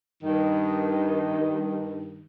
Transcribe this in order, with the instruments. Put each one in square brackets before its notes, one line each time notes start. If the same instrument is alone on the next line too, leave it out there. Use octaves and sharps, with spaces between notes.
[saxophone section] G2 D#3